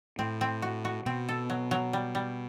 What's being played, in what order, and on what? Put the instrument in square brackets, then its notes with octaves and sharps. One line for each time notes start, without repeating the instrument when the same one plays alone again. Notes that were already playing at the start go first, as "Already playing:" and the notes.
[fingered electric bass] A2 [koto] C4
[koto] C4
F#4
F#4
[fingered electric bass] B2 [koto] C4
[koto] A4
F#3
F#3
G3
G3